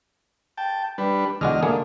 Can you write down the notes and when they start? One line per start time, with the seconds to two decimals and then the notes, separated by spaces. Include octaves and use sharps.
0.57 G5 A5
0.98 G3 D4 B4
1.41 E2 D3 G#3 F#4 D#5 F6
1.63 D3 A3 A#3 G#4